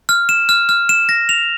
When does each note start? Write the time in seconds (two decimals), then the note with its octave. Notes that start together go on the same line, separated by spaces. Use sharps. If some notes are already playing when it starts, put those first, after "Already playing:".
0.09 F6
0.29 E7
0.49 F6
0.69 F6
0.89 E7
1.09 A#6
1.29 F7